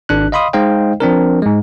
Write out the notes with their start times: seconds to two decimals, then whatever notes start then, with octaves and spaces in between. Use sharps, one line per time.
0.09 G#1 D4 F#6
0.32 D#5 F5 B5 C6 D#6
0.53 G#3 D#4 C5 D#5 F5 G5
1.00 F3 C4 D4 A#4
1.42 G#2 G#3